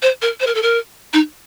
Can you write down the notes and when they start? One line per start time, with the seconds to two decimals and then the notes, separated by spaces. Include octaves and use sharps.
0.02 C5
0.22 A#4
0.40 C5
0.47 A#4
0.55 A4
0.62 A#4
1.13 D#4